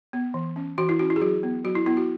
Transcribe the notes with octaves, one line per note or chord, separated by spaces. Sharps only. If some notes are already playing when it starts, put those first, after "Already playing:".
B3
E3
C#4
E3 F#4
E4
C#4 F#4
E4
G#4
F#3 F#4
B3
F#3 F#4
E4
B3 E4
F#4